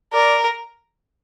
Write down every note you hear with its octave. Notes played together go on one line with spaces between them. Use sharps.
A#4 D5